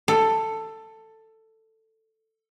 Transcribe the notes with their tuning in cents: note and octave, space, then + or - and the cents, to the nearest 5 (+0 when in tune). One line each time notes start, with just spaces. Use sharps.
A4 +10